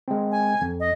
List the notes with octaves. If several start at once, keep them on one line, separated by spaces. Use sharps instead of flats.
G#3 C4
G#5
F2
D#5